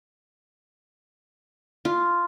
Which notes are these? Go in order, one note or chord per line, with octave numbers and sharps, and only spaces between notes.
F4